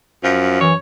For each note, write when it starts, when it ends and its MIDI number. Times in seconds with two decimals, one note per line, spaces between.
0.24 0.79 42
0.24 0.57 53
0.61 0.74 52
0.61 0.76 73